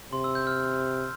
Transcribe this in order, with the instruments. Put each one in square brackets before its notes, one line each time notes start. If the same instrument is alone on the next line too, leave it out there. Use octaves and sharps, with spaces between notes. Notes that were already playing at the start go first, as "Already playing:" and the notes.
[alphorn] C3 [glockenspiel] C6
[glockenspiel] E6
G6
F6